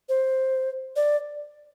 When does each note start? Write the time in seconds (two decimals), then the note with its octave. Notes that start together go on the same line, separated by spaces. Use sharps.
0.09 C5
0.96 D5